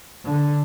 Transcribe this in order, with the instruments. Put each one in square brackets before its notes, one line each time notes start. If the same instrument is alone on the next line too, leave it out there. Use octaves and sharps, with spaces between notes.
[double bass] D3